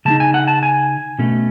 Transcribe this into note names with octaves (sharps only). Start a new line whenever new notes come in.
C#3 G#3 D#4 A5
G#5
F#5
A5
G#5
B2 A3 C#4